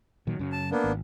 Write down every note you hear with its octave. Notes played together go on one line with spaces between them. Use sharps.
A#2 D#3 F#3
F#2 C#3 F#3
A5
A#3 B3 D4
G#1